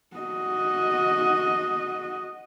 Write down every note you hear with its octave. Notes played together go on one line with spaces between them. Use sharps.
F#4 D#5